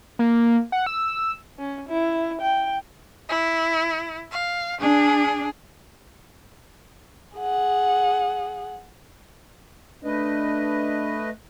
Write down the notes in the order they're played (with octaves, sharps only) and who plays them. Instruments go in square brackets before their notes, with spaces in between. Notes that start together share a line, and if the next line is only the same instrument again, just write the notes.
[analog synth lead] A#3
F#5
E6
[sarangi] C#4
E4
G5
[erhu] E4
F5
[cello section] D4 [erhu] G#4
[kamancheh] G#4 F#5
[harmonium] A3 B4 D#5 [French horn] D4